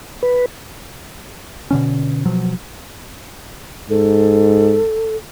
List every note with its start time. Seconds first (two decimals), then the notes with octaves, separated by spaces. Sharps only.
0.23 B4
1.71 B2 D3 C#4
2.25 B2 F3 F#3
3.90 G#2 A4